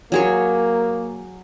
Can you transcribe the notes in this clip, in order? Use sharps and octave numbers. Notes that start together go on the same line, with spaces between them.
F#3 A#3 G#4 C#5